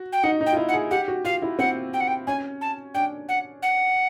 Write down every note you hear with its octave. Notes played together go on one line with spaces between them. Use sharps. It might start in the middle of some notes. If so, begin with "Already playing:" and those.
Already playing: F#4
G5
D#4 F#5
D#4
G5
F4
E4
F#5
G#4
G4 F#5
F#4
F4 F5
E4
C4 F#5
G5
F#5
G5
C#4 G#5
A5
D4 G5
F#5
F#5